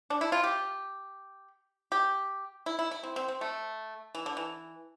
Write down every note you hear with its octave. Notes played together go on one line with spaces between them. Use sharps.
D4
E4
F4
G4
G4
E4
E4
E4
C4
C4
C4
A3
E3
D3
E3